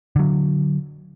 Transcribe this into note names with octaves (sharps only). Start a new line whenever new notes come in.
D3 F#3